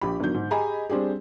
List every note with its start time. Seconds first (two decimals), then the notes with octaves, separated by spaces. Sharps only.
0.01 A#1 G4 B5
0.20 G1 D3 D#3 F#3 G6
0.34 G#2
0.51 G4 G#4 D#5 G#5 A#5 B5
0.90 G3 C4 D4 G4 G#4